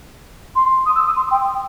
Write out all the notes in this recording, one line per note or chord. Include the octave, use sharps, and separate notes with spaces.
C6
D#6
E6
D#6
C6
G5